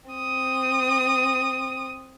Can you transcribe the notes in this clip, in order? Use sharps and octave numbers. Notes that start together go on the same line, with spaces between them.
C4 D#6